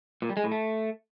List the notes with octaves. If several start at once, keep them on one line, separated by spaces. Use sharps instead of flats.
A#2
G3
G#3
A2
A3